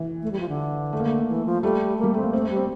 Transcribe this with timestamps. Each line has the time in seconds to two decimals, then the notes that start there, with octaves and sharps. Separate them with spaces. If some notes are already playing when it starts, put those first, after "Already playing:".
Already playing: E3
0.23 A3
0.32 G3
0.39 F3
0.49 D3
0.93 A3
1.00 A#3
1.06 A3
1.28 E3
1.46 F3
1.62 G3 A3
1.98 G3 A#3
2.14 A3 C4
2.23 A#3
2.33 A3 C4
2.45 C4
2.50 G3
2.56 C4